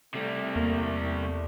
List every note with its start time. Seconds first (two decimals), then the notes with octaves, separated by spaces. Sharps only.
0.14 C3 G3 A3
0.56 E2 A#3